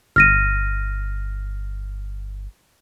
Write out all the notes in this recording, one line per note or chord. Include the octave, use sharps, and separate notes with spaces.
G1 F6 A#6 D#7